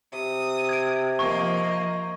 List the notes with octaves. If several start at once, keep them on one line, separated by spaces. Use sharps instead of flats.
C3 D#6
G#6 D7
F3 A#3 D#5 C#6